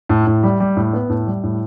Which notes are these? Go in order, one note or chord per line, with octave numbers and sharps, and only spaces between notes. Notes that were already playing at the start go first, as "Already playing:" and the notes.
A2
A2
G3
G3
A2
B3
A2
G3
A2